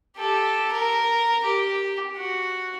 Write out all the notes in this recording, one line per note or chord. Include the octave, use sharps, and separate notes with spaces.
G4 A4
A#4
G4
F#4